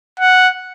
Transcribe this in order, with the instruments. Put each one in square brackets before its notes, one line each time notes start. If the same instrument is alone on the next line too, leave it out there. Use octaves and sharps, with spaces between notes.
[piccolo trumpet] F#5